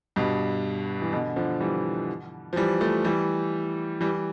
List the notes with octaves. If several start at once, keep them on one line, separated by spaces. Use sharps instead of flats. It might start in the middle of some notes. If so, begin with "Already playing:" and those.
G2 B2
E3
B2 D3
D3 F3
E3 G3
F3
E3 G3
F3 A3
E3 G3
E3 G3